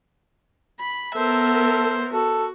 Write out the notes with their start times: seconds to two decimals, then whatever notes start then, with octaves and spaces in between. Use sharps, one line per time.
0.80 B5
1.16 B3 A4 A#4 C5 E5
2.13 F#4 A4